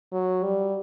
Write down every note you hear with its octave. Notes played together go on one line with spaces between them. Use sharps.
F#3
G3